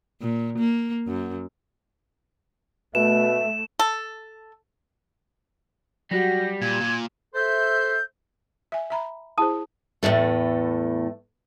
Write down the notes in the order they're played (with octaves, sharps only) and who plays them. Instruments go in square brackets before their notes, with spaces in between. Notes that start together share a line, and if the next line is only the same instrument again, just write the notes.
[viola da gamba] A#2
A#3
F#2
[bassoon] B2 [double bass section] A3 [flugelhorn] E5 [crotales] E7
[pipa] A4
[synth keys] F#3 F#4 F#5 [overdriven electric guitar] G3 [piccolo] A#6
[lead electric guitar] A#2 [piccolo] G#6 [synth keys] D#7 E7
[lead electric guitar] A#2
[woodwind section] A4 C5 E5 [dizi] G6
[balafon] E5 G#5
E5 A#5 B5
[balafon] E4 G#4 C5 [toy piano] A5 D#6
[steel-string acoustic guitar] E2 A2 C#3 A3